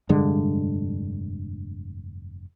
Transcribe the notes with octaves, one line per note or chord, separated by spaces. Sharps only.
F1 G2 D3 G#3